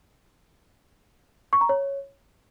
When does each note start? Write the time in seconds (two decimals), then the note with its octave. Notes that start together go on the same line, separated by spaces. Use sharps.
1.53 C#6
1.61 A#5
1.69 C#5